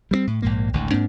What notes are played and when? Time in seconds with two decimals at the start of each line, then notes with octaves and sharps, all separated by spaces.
0.11 G3 A3 C4
0.27 A2
0.42 A#1 G#2 A#3
0.73 G#1 D2 A2
0.91 G#2 A#3 C4 D4